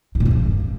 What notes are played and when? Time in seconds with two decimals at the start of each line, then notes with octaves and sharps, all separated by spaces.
0.15 G#2
0.20 A#2
0.25 G#2
0.31 C#3